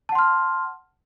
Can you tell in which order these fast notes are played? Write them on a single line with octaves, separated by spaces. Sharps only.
A5 F#5 C6 F6